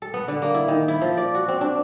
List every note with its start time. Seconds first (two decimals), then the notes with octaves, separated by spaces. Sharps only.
0.02 A4
0.14 B3
0.28 D3
0.42 A#3
0.54 E4
0.68 D#3
0.88 E4
1.02 F3
1.17 D5
1.35 F#4
1.48 C4
1.61 D4